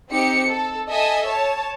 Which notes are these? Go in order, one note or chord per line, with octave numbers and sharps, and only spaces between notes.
C4 D#4 G4 C#7
A4
A4 D#5 E5 G#5
C#5 A5